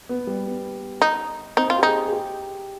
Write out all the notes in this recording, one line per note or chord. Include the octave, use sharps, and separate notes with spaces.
B3
G3
B3
D#4
C4 D#4
F4
G4
D#4 G#4
G#4
G4